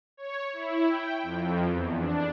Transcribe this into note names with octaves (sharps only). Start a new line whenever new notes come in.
C#5
E4
G5
F2
E2
D4